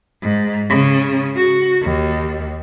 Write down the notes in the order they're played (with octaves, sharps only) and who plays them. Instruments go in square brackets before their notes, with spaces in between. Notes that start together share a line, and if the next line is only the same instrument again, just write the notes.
[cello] G#2
C#3
F#4
D#2